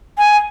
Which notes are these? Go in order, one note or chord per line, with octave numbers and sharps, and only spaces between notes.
G#5